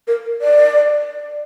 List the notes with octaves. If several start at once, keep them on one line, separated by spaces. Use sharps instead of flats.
A#4
D5